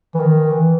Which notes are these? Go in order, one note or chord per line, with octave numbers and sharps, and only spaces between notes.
E3
D#3
E3